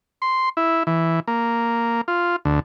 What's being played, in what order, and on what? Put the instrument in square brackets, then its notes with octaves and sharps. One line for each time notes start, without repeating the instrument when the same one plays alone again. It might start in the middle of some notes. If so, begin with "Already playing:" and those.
[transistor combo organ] C6
E4
E3
A#3
F4
D2